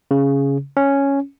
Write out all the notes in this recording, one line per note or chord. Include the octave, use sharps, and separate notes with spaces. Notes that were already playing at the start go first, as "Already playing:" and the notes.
C#3
C#4